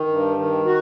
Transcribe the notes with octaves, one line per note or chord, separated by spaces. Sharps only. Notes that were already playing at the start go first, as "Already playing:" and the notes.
Already playing: D#3
G2
D#3
F#4